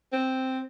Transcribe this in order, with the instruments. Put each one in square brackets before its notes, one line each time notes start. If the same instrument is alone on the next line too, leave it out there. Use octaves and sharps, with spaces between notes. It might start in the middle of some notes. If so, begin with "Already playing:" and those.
[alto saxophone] C4